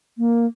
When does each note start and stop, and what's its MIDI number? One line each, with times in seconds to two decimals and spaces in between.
0.18 0.46 58